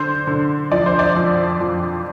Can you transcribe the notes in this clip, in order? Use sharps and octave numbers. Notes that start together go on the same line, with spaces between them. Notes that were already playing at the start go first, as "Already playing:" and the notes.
Already playing: D3 C5
D3
F3 D5
C5
D5
F2
F2